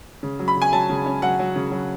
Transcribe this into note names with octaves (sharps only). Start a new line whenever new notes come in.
C#3
F#3
B5
C#3
G#5
F#3 A5
C#3
C#4
F#3 F#5
F#3
C#3
F#3